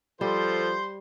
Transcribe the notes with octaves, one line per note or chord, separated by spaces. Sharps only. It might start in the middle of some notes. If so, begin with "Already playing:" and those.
F3 G3 A4 C5 C6